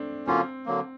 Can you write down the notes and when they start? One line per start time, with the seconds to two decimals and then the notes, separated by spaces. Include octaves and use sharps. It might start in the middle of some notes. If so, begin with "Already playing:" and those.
Already playing: A3 C4 D4
0.27 D3 F#3 A#3 C4 C#4 F4
0.66 D3 F#3 A#3